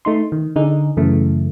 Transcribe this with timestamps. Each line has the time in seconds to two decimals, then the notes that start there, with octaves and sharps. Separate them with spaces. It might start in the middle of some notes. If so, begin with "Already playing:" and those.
0.05 A3 D#4 C6
0.32 D#3
0.56 D3 D#4 G#4
0.97 F#2 C#3 E3 A3